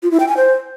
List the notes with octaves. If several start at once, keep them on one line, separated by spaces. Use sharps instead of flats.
F4
E4
G5
G#5
C5